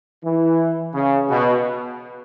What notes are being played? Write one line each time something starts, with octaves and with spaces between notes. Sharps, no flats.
E3
C#3
B2